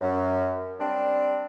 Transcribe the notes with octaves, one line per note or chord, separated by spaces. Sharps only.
F#2
G3 C4 D4